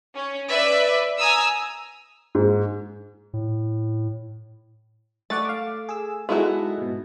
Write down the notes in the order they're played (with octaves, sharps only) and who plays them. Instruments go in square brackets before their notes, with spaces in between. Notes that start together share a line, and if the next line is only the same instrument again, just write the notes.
[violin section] C#4
B4 D5 E5
G#5 A#5 D#6 E6
[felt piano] G#2
[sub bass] A2
[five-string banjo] A3 [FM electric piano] D5 F#5 A6
[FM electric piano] F5 D6
G#4 E6
[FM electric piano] G#3 D#4 A4 [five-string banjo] B3 E4 F#4
[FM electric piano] G#2 B2